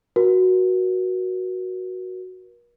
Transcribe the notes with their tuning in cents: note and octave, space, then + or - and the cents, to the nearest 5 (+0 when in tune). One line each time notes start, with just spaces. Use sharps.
F#4 +0 A#4 +40